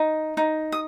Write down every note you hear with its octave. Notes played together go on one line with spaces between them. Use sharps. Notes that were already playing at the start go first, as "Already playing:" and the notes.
Already playing: D#4
D#4
D#6